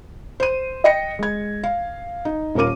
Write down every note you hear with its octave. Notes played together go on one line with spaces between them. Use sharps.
C5 D#7
D#5 G5 A#6 C#7
G#3 G#6
F5
D#4
D#1 C#4 F4 A#4 D6 D#7